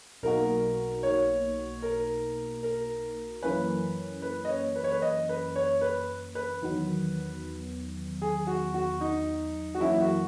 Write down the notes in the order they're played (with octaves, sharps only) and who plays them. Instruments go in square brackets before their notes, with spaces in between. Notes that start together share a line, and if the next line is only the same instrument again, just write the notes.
[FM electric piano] B1 B2 A#3 D#4 F#4 [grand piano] A#4
[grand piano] C#5
A#4
A#4
[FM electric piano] F#2 E3 A#3 C#4 [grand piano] B4
[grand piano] B4
D#5
C#5
B4
C#5
B4
D#5
B4
C#5
B4
B4
[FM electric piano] E2 D#3 F#3 B3
[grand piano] G#4
F#4
F#4
D#4
F#4
[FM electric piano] F#2 E3 A#3 C#4 [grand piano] E4
[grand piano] F#4